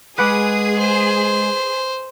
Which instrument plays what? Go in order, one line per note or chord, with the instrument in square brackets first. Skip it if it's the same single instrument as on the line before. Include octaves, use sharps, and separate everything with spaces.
[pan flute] G#3 [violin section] G#4 [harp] B4 F#5 D6 [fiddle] D#6
[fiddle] C5